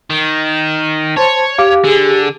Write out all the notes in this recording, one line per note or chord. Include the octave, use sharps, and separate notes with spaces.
D#3
C5 C#5 A5
G4 F5 D6
D3 G#4